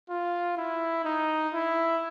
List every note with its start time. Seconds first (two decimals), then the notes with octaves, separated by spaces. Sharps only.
0.10 F4
0.57 E4
1.05 D#4
1.53 E4